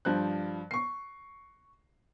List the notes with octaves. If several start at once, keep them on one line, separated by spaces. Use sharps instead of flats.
G2 F3 C5 F#6
C#6 C7